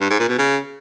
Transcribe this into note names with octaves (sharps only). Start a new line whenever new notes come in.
G2
G#2
A#2
B2
C#3